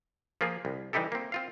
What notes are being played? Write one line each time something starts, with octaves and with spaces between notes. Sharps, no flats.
F3 A#3 F4 G#4
C2
E3 G3 D#4 E4 G4 A4
A#3 C4
C4 F4 F5